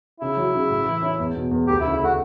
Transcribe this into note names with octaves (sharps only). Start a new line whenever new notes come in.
C#3 E4
F#3
C#3
A2
E3
C#4
E2
B2
E2
D2 G4
E4
C#3
E4
A3 F#4